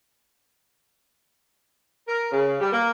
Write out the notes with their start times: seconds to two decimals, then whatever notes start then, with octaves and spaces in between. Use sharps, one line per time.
2.08 A#4
2.32 C#3
2.60 G3
2.72 A#3